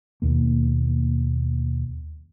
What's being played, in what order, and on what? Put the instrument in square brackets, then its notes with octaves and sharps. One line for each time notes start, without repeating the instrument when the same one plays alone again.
[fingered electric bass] D#2 B2 A#3